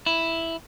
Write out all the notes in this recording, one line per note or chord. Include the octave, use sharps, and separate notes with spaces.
E4